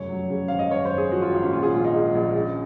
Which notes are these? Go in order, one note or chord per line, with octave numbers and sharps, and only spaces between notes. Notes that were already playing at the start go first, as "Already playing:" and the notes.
Already playing: F1 F#2 C#5
F#3
C#3
G#1 F5
D#5
F#2 C#5
C5
G#1
G#4
F3 F#4
F4
G#1
C#4
A#2 F4
G#4
A#1 F4
D#4
G#3
A#1
C#3